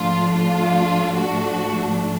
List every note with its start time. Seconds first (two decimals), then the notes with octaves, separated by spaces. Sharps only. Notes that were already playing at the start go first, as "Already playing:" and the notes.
Already playing: G#2 F3 A3 D4 F4
0.33 F4
1.14 F#4